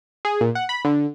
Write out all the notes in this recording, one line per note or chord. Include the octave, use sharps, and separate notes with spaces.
G#4
A#2
F#5
B5
D3